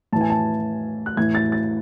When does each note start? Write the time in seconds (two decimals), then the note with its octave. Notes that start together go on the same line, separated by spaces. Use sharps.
0.12 A2 E3 A5
0.21 G#5
0.30 A5
1.06 F#6
1.17 A2 E3 G#6
1.35 A6
1.52 A6